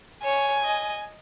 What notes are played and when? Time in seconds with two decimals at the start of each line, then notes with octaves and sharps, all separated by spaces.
0.24 C#5 G#5
0.64 D#5